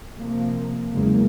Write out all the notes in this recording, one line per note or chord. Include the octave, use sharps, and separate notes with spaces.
C3 F3 A#3
F#1 E2 G#3 A#3